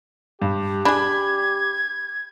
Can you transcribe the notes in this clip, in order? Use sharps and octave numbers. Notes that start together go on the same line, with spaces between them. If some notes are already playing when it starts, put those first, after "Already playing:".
G2 G4
D4 G#4 B5 G#6